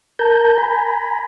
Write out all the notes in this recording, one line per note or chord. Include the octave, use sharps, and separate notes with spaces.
A#4 A5 A#5 G6
G#5 A#5 B5